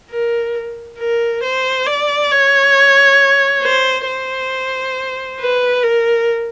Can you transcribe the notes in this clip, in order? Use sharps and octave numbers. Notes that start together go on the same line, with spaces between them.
A#4
A#4
C5
D5
C#5
C5
C5
B4
A#4